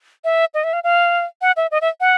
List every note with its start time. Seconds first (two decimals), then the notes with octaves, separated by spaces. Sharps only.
0.24 E5
0.54 D#5
0.64 E5
0.73 F5
0.84 F5
1.42 F#5
1.57 E5
1.71 D#5
1.81 E5
2.01 F#5